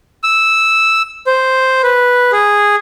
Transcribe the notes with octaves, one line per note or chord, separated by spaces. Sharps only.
E6
C5
B4
G#4